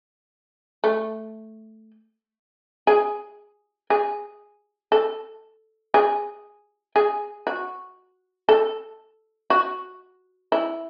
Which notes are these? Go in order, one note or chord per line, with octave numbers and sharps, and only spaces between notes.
A3
G#4
G#4
A4
G#4
G#4
F#4
A4
F#4
E4